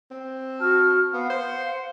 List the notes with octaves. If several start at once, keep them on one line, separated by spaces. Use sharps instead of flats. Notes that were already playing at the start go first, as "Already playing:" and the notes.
C4
F#4 A5 F6
B3 F5 F#5
C5